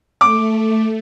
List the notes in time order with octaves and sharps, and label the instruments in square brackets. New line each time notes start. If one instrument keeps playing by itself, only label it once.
[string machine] A3 [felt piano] D6